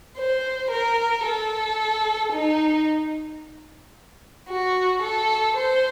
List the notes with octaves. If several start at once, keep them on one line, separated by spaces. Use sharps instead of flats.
C5
A#4
A4
D#4
F#4
A4
C5